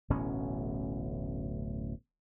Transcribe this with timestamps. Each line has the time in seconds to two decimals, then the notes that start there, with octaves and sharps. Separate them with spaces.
0.10 D1 A1 B2 C#4